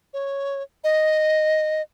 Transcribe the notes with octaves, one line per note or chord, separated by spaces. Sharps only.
C#5
D#5